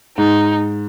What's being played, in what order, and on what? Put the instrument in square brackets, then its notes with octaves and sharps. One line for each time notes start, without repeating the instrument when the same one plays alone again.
[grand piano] G#2 [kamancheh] D#4